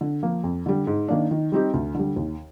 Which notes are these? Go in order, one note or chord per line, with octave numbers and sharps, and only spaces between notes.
D3
F3 A#3
F2
D3 G3
G#2
D#3 A#3 D4
D#3
G3 C4 D#4 G4
D2
D3 G3
D#2